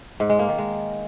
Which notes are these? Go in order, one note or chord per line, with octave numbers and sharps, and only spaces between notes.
G#2
G#3
A#3
D#3
G#3